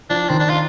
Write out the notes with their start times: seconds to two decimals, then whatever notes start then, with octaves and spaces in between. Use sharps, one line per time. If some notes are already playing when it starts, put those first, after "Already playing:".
0.10 F3 D4
0.30 D#3 C4
0.40 D4
0.49 F4